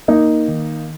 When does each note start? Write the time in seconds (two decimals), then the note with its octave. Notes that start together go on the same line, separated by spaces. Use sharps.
0.08 A#3 D#4
0.48 D#3